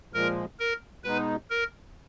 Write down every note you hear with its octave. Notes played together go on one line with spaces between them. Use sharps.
A#2 F3 G#3 A#4
A#4
B2 G#3 B3 D#4 B4
A#4